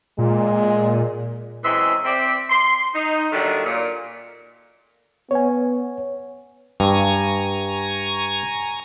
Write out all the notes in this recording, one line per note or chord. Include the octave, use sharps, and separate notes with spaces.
A#2 G#3
F#2 E3 G#3 C4 E5 C6
C4 D5 E5
C6
D#4
A#2 D3 D#3 F#3 G3 A3
A#2
B3 C#5 G#5
G2 G#5 A#5 C#6